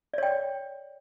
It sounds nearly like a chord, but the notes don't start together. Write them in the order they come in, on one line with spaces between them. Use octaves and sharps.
D5 C#5 G5